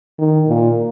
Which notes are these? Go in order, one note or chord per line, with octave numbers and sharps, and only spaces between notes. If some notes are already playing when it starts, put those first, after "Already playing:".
D#3
A#2